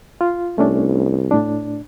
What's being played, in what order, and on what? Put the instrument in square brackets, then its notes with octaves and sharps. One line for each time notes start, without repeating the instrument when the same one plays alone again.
[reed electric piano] F4
[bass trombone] C2 [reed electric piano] A3 C#4 D4
[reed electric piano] A2 D4